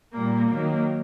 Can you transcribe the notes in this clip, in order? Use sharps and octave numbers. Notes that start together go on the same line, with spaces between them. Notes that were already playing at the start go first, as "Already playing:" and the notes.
A#2 G3 A#3
D#3 F#3 A#3